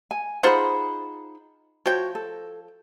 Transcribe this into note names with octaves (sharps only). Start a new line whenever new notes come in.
G#5
D#4 F4 G#4 C5 F#5 B5
F3 F#4 C#5 G5
A4